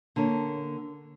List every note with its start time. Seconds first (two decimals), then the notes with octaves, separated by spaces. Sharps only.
0.16 D3 A#3 C#4